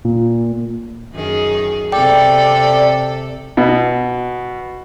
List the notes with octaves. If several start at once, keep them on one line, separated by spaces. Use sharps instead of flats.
A#2
F#2 D#3 G#4
C3 A4 D5 G5
B2